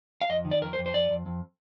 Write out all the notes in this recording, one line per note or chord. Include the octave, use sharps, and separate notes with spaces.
F5
F2 D#5
D#3
D5
F2 A#4
C5
F2
C5
F2 D5
F2
F2